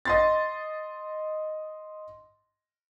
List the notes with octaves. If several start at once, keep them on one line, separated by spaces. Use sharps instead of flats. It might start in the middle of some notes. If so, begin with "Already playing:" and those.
D#5 C6 A6